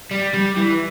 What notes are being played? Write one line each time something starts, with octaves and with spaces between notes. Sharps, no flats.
G3
G3
E3